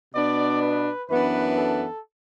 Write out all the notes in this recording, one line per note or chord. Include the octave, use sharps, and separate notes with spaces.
B2 B3 D4 D5
B4
F#2 E3 B3 D4 B4
A4